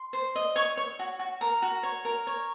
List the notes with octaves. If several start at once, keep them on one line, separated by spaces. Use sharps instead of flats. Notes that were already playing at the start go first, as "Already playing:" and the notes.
Already playing: C6
C5
D#5
C#5 C#6
C#5
F#4
F#4
A#4 A#5
F#4
C#5
A#4
C#5